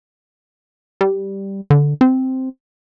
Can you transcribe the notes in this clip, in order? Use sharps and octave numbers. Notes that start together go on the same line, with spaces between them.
G3
D3
C4